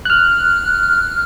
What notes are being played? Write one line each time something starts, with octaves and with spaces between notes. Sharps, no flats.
F6 F#6